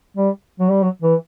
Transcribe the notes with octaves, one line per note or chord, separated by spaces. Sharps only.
G3
F#3
G3
F#3
E3